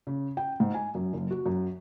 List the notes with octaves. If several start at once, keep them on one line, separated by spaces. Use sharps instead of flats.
C#3
G5
G#2
G#5
F#2
F#1
F#4
F#2